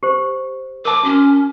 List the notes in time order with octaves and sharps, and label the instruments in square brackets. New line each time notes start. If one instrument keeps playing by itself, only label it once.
[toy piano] G4 C5
[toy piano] A#4 A5 [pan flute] D6
[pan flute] C#4 [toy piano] F#4